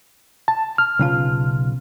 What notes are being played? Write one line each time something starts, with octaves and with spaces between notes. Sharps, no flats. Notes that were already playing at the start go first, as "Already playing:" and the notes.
A5
F6
B1 C#3 F4